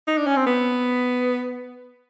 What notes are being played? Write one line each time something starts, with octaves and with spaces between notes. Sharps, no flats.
D#4
D4
C#4
C4
B3